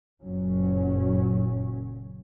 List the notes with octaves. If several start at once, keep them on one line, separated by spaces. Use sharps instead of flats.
F#1 F#2 A#2 F#3 C#4